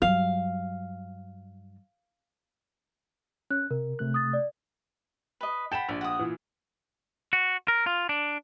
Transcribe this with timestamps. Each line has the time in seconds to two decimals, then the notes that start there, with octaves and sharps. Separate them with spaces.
0.02 G2 F#3 F5
3.51 C#4 F#6
3.71 C3 A#4
3.99 C3 A3 F#6
4.14 D#6 A6
4.33 D5
5.41 B4 D#5
5.72 A4 F#5 G5 B5 E7
5.89 A#1 D5
6.01 F#5 D#6
6.19 A#2 E3
7.33 F#4
7.68 A#4
7.86 F4
8.09 D4